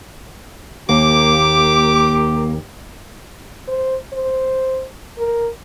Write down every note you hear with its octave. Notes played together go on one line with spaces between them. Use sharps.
D#2 A#3 G4 D6
C5
C5
A#4